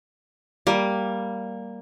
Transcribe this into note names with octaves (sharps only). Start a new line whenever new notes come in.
G3 A#3